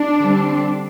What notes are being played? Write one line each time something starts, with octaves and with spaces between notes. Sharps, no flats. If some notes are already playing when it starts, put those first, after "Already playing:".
Already playing: D4
D3 G3 C4